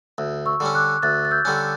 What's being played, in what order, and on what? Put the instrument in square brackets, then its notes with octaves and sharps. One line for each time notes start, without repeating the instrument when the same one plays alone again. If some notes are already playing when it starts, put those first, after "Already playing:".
[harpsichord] D2
[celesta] C#6 E6
[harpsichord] D3 G3 C#4
[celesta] D6 F#6
[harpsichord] D2 [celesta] F#6 A6
[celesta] A6
E6 G6
[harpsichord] D3 G3 C#4